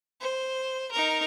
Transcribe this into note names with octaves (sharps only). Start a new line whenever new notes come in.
C5
D#4 A#4